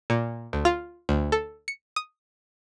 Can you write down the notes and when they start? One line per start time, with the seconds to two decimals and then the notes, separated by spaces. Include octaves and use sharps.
0.10 A#2
0.53 D2
0.65 F4
1.09 D2
1.32 A4
1.68 C#7
1.96 D#6